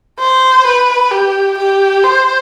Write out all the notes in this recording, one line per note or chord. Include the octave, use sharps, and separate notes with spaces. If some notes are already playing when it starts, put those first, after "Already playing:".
C5
B4
G4
G4
C5